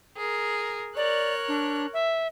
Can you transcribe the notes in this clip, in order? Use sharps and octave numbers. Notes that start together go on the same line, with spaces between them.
G#4 A#4
A#4 C#5 D5 F#6
D4
E5